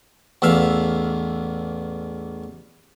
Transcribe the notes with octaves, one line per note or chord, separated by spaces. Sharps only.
A1 E2 E5 F5